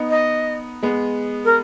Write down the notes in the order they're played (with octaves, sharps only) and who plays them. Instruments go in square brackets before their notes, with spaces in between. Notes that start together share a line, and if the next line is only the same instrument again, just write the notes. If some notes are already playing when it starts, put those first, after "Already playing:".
Already playing: [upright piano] B3 D#4
[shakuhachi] D#5
[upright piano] G#3 B3
[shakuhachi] A#4